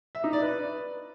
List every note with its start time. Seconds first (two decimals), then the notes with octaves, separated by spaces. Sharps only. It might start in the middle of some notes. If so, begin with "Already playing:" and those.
0.15 E5
0.24 D#4
0.33 D5
0.42 B4